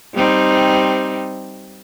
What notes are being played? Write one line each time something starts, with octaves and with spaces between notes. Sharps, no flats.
G3 C4 D#4